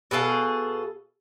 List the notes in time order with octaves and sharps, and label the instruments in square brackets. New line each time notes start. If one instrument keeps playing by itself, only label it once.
[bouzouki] B2 G#4 A4 F5